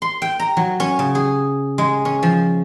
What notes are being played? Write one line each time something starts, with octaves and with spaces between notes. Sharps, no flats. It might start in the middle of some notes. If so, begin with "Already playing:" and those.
C6
G5
A#5
F#3
C#4
C#3
G#4
G#3
C#4
F3